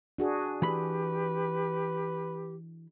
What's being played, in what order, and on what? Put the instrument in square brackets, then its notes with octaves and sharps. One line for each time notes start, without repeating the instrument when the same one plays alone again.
[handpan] D4 F#4 G#4
[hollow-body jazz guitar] E3 B5 [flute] G4 [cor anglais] B4